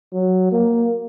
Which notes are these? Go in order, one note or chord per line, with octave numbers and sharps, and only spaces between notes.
F#3
A#3